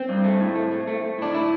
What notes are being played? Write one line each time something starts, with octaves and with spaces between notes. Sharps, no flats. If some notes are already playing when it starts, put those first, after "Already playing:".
Already playing: C4
G2
A3
A2
A3
A3
A3
A3
A2 D4
E4